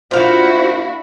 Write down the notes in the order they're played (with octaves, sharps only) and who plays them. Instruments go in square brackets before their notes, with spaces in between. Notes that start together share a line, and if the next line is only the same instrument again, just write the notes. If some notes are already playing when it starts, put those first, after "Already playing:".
[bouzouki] A#2 F5 [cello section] D4 E4 F#4 [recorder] C5